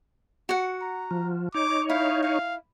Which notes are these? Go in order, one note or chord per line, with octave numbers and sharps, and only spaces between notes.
F#4 F#5
A#5
F3
D#4 C#5 D6
E4 F5
F5